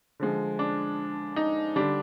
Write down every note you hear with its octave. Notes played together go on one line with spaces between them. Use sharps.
D3 F3 G#3
D4
D#4
D3 G3 D4